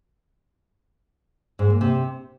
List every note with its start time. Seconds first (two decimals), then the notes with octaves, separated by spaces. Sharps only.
1.59 G#2
1.70 A#3
1.81 C3